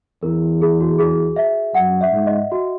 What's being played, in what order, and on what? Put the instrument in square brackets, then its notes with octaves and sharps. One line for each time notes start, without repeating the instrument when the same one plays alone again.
[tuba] E2 [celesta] A#4
[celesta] G#4
F#4
G#4
E5
[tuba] F#2 [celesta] F#5
[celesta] E5
[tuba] G#2
[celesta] D#5
F#4